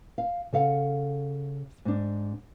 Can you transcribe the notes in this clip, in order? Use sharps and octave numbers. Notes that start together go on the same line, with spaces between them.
F5
C#3 A4 F5 F#5
G#2 D4